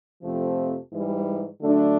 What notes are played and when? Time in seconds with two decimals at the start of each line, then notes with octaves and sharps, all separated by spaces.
0.23 F2 C3 F3 A3 C4
0.92 G#2 E3 G3
1.61 D3 F#3 A3 D4